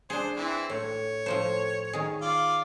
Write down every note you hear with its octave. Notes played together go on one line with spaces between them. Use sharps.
D4 G#4 C5
E3 C4
A2 C#5
A2 F3 C5
D#3 G#4
F4 D5